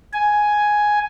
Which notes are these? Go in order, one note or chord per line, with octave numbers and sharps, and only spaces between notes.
G#5